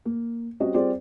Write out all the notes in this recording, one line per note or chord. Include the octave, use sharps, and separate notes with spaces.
A#3
G3 C4 C#4 F#4 D#5
G3 C4 F4 G#4 C5 D5